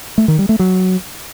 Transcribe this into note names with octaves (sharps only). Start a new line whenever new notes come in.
A3
D#3
G3
A3
F#3